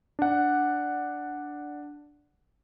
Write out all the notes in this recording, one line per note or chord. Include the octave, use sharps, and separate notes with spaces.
D4 F#5